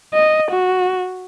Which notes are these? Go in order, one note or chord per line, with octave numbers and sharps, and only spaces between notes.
D#5
F#4